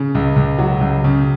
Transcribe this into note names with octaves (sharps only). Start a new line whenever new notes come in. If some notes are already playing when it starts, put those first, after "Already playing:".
Already playing: C#3
C#2
C#2
F#3
C#2
C#3